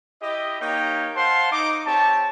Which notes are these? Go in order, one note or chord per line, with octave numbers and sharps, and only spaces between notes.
E4 G4 D#5
A#3 D#4 G4 C#5 G5
C5 F5 F#5 A5 C6
D#4 D6
C4 G4 C#5 A5